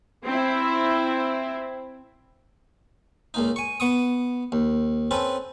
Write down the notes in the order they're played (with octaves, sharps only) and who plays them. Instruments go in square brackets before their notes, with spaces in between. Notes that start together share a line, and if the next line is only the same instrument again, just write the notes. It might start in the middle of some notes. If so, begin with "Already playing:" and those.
[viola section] C4 E4
[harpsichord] C#2 A#2 D#4
G#5 C#6
B3 C#6 D#6
D#2
C4 C#4 A4 B4